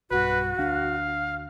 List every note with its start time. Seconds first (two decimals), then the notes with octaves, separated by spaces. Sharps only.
0.11 B1 G2 F#4 B4
0.58 D2 D4 F5